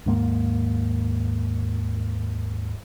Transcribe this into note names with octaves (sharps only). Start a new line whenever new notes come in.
D#2 G#2 A#3